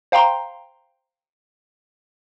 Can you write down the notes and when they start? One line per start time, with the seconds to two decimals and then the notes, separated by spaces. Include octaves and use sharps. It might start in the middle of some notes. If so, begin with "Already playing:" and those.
0.12 C5 F5 G5 A#5 C6